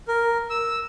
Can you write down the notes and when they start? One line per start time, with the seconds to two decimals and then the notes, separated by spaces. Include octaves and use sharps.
0.08 A#4
0.50 E6